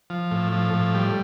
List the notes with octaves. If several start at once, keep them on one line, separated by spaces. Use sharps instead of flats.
F3
A2
F3
A2
G3